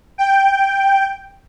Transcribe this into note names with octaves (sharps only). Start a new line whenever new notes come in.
G5